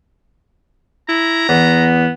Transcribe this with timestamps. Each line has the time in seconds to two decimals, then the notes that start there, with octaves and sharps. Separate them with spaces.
1.09 E4 A#5
1.49 E2 B3